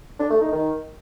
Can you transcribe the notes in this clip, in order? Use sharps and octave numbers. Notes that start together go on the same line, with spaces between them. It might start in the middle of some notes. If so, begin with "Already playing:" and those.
D4
A3
D#4
D#3